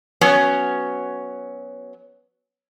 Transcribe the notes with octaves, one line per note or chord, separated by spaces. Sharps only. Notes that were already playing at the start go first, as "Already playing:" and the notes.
F#3 B3 C#4